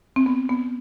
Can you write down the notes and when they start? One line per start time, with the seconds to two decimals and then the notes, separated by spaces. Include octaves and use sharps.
0.16 C4
0.26 B3
0.49 B3